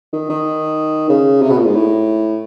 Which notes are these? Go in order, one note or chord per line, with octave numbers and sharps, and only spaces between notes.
D#3
D#3
C#3
C3
B2
A#2
G#2
A2